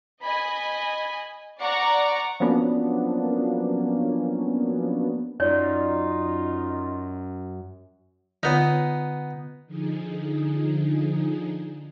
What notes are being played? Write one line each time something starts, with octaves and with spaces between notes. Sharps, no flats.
D#5 G#5 B5
D5 F#5 A#5 C#6
F3 F#3 A#3 B3 C#4 D4
F#2 D#4 F4 C#5 D5
D3 B3 D#4 F4 C#5
D3 F3 D#4 G#4